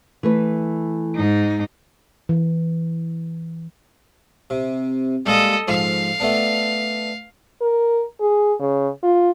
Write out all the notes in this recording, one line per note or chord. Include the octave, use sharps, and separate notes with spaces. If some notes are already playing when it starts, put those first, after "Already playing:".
E3 A3 B4
G#2 D#4
E3
C3
G3 G#3 A#3 A4 D#5
G#2 F3 F5
A3 B3 D4
A#4
G#4
C#3
F4